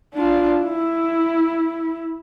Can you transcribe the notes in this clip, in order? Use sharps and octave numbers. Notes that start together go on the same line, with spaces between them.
D4 F4
E4